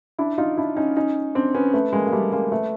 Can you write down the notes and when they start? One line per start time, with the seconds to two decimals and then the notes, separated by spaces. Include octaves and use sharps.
0.19 D4 E4
0.38 D#4 F4
0.57 D4 E4
0.76 C#4 D#4
0.96 C#4 D#4
1.35 C4 D4
1.55 B3 C#4
1.74 A3 B3
1.93 G#3 A#3
2.06 A#3
2.13 G3 A3
2.32 G#3 A#3
2.51 A3 B3